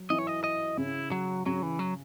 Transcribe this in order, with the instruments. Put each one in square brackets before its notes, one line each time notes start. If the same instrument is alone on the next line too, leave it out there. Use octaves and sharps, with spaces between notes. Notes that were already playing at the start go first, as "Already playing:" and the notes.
Already playing: [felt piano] F#3
[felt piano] E3 [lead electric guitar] D#5
[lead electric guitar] C#5
D#5
D#5
[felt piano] C#3 [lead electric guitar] E4
[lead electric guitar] F#3
[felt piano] C#3 [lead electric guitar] F#3
[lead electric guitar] E3
F#3